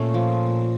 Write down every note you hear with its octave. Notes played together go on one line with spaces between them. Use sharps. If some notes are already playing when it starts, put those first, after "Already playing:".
Already playing: A#2 A3 C#4
F3